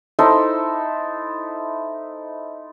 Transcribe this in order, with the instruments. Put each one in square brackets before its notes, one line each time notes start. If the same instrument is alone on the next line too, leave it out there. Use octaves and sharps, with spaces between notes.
[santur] D#4 E4 A4 C5